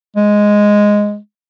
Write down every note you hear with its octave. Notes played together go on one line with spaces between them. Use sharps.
G#3